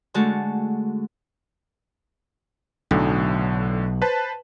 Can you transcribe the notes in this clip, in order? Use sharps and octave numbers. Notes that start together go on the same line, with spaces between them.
D3 G#3 A3 F#4 A5
B1 A2 D3
B4 C5 A5